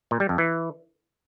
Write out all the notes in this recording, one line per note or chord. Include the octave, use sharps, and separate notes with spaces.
A#2
G3
F2
E3